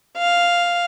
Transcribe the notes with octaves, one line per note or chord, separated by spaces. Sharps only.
F5